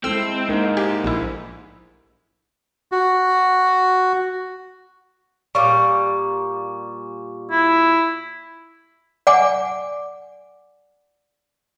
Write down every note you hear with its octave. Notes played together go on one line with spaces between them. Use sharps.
G#3 C4 E4 A4 E6
G#2 A#3 D#4 A#4
G4
A#1 E4
F#4
A#2 G3 C#6 D6
E4
D5 F#5 G#5 D6